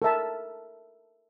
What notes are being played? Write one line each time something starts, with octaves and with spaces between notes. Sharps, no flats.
A4 A#4 E5 A5